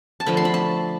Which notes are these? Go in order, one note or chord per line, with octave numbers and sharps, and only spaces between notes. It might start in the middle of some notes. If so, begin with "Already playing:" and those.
A5
D3 F3 A3 B5
C6
B5
A5